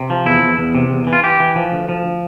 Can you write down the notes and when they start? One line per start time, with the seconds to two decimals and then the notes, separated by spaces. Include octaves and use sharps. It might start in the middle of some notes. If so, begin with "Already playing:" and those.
Already playing: C3
0.10 F3
0.26 E2 E4
0.42 E2
0.58 E2
0.75 C3
0.91 E2
1.07 E3
1.13 F4
1.23 E3 G4
1.40 E3
1.56 F3
1.72 D2
1.89 F3